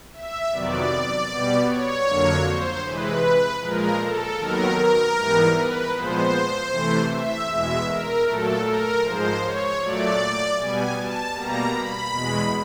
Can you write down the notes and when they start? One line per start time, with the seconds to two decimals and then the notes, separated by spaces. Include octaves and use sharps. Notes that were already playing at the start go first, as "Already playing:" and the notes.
0.13 E5
0.52 F2 C3 D#3 F#3 B3 D5
1.30 B2 G3 B3
1.67 C#5
2.06 F2 D3 F#3 A#3
2.45 C5
2.83 C3 E3 G#3 B4
3.61 A#2 F3 G#3 A#4
4.00 A4
4.38 D#2 D#3 F#3 B3 A#4
4.77 A#4
5.16 G#2 E3 G3 B3
5.54 B4
5.93 A#2 F3 G#3 B3 C5
6.70 C3 E3 A3
7.09 E5
7.48 E2 B2 G#3 E5
7.87 A#4
8.25 A#2 F#3 A3 A4
8.64 A#4
9.02 G#2 F3 G#3 C5
9.42 C#5
9.80 A#2 F#3 A3 D5
10.57 B2 G3 B3 G#5
10.95 A5
11.34 B2 G3 A#3 A#5
11.74 B5
12.12 E2 B2 G#3